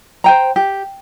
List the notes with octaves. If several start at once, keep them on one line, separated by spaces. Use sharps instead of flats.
C5 G5 A#5
G4